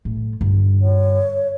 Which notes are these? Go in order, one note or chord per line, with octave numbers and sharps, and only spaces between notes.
A2
G2 D3
C#5